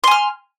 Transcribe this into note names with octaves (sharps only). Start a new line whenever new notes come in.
G#5 C6 F6